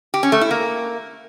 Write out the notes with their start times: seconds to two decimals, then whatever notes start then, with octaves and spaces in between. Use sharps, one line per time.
0.14 G4
0.23 C#4
0.32 A3
0.41 E4
0.51 A#3